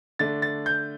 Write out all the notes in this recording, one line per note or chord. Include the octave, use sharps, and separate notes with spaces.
D3 A3 D4 A6
A6
G6